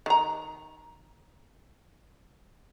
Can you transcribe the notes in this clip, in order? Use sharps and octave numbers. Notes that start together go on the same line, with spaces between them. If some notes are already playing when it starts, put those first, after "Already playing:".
D#3 A#5